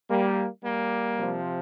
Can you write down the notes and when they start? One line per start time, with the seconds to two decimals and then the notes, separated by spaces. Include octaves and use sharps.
0.09 G3 A#3
0.63 G3 A#3
1.17 C3 F3